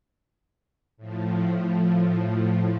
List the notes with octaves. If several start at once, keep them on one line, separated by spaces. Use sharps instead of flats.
A2 F3